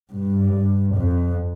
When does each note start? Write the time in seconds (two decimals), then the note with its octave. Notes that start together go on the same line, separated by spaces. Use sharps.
0.13 G2
0.95 F2